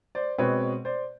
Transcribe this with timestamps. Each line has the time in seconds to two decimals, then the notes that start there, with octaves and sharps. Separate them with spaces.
0.15 C5 D5
0.38 B2 G#3 C4 B4 C#5
0.85 C5 D5